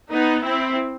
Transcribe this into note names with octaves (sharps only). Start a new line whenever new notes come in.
B3 D#4
C4 E4